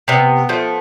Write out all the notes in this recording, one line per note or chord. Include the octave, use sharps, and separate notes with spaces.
C3 B3
F3 A3